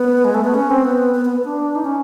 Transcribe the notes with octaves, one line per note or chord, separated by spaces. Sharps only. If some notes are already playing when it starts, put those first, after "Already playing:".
Already playing: B3
G#3
A3
B3
C#4
C4
B3
B3
B3
D4
D#4
C#4